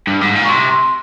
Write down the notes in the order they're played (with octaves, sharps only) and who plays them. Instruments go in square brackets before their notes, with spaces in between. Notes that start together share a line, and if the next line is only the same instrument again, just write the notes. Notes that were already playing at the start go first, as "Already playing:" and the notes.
[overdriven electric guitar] G2
G#2
A#2
[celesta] C#6
[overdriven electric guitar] C3 [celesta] C6
[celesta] C6